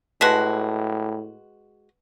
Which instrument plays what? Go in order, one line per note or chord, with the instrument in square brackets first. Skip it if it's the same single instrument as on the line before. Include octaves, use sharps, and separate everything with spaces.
[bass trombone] A2 [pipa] G#3 F#4 [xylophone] B4 A5 B6